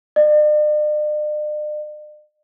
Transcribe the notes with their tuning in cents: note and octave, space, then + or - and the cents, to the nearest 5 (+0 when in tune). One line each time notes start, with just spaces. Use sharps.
D5 +45